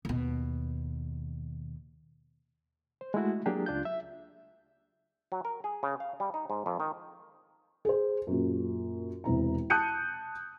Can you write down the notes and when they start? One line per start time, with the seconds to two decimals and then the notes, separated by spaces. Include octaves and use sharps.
0.05 D#2 B2
3.01 C5
3.14 G#3 A3 E4 F#4
3.46 F#3 A#3 D4 G4 G#4
3.66 C#2 D4 F4 G6
3.85 E5
5.32 F#3
5.45 A#4
5.64 G#4
5.83 C#3
6.00 F5
6.20 G3
6.34 D#4
6.50 G#2
6.66 F2
6.80 D#3
7.85 G#4 C5
8.27 F#2 A#2
9.24 E1 C3 E4 A#5
9.70 A5 D#6 F#6 G6 C#7 D#7